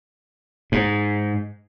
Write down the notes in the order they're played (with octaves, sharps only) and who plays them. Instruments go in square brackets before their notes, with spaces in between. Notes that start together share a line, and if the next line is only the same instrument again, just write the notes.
[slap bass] G#2